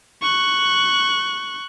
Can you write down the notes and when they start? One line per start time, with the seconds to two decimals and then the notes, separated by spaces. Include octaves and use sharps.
0.22 C#6 F#6